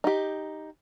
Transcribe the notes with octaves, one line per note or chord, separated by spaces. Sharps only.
D#4 G4